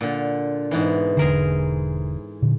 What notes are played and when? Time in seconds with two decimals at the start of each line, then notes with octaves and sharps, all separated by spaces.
0.01 A#2 D3
0.71 G#2 B2 E3
1.17 E1 D3 G#4 A#4 C5
2.42 A#2 D3